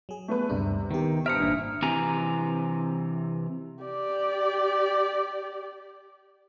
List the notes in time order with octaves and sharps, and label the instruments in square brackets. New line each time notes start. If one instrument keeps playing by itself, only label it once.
[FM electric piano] F#3 G#4
[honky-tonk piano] A3 B3 B4
[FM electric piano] D2 G2 D4 [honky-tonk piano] C3
[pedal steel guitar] D#3 [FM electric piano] B3 G4
[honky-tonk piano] G2 C5 D7 [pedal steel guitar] E5 A#5 D#6 [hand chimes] F6 C#7
[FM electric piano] G#1 A#2 [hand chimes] D4
[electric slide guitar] C3 E3 G#5 A#5
[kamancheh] G4 D5